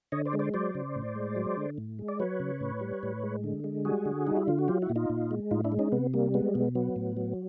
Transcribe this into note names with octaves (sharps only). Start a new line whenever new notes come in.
D3 C#5 D#5
C5 D5
G#3
C5 D5
F#3 C5 D5
C#3
A2
G#3
F#3
D3
A2
G#3
D5
F#3 B4 C#5
C#3
A2
G3
A2
G#3
D3
G#3
G3 F#4 G#4
D3
G3 D#4
E4
D3 F4
F#4
F#3 F4 G4
E4 F#4
A#2
D#4 F4
A#2
G#3
A2 D#4 F4
D4 E4
G#3
C#4 D#4
C3 B3
G3 A#3
G#3 B3
B2 B3
F#3 B3
A2
F#3